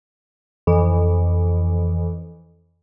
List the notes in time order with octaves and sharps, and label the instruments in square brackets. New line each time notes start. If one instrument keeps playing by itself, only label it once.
[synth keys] F2 E3